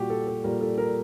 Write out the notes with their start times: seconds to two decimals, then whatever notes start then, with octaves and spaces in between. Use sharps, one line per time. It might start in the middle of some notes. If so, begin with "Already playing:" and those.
Already playing: A#2 G3 F#4 G4
0.10 A4
0.27 A4
0.44 A#2 G3 A#4
0.61 A4
0.78 A#4